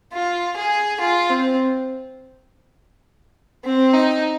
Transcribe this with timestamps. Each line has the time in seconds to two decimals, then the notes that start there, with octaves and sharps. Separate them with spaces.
0.13 F4
0.56 G#4
1.00 F4
1.30 C4
3.64 C4
3.94 D#4